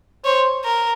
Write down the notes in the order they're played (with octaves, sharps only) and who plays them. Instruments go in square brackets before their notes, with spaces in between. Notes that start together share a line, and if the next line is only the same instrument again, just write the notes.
[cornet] C5 [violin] C#5
[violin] A#4